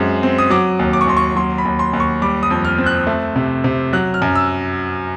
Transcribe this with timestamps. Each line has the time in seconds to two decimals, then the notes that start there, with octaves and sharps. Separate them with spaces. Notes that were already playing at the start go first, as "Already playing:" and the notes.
Already playing: F#2 G#3 C4
0.23 C4
0.38 D#6
0.50 F#3 D6
0.79 D#2
0.93 D6
1.01 C#6
1.07 D#2 C6
1.17 C#6
1.36 F#3 C6
1.58 B5
1.65 D#2
1.79 C6
1.93 D#2
2.00 C#6
2.22 G3 D6
2.43 D#6
2.51 F2
2.65 F6
2.78 C4
2.86 F#6
3.07 A3
3.36 C3
3.64 C3
3.93 F#3 F#6
4.14 F6
4.22 F#2
4.35 E6